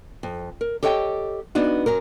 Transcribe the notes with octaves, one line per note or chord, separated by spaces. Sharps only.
F2
A#4
G4 A4 C#5 D#5 G5
B3 D4 D#4 F#4
F#2 F#3 A#4